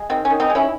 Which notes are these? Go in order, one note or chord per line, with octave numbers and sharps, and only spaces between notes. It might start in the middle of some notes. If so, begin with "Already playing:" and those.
Already playing: G#3
D#3 C4
C#4
D#3
C4 D#4
G#3
C#4 E4